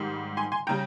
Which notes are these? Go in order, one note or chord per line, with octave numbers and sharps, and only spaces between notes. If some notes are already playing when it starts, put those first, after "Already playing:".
Already playing: G#2 D#3 G3
G#5 C6
G#5 C6
C#3 G3 G5 A#5